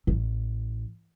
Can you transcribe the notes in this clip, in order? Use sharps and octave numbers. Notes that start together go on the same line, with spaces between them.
A1